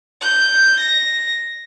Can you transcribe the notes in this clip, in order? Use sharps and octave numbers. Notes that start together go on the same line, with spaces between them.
G6
A#6